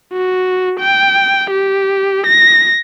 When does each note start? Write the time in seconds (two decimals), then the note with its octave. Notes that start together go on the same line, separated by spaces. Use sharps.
0.13 F#4
0.80 G5
1.50 G4
2.27 A#6